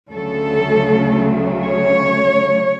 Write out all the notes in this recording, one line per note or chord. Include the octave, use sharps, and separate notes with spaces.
D2 C#3 F#3 A3 A4
C#5